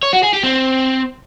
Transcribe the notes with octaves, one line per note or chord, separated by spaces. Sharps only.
C#5
F#4
G#4
G4
C4